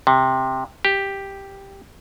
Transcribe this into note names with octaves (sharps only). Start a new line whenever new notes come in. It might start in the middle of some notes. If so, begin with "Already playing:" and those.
C3
G4